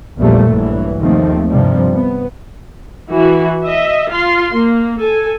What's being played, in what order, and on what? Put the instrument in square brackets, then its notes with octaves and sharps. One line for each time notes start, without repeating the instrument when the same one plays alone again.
[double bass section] A#1 E2 A#2 F3 G3 A3
A#1 G2 E3 F#3
D#2 C3 D#3 F3 A3 C4
G2 C3 F3 G3
B3
[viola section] E3 F#4
D#5 E5
F4 C6
A#3
A4 G#5